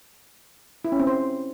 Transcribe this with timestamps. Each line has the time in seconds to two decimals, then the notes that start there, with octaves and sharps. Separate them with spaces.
0.85 E4
0.92 C#4
1.00 C4
1.07 C5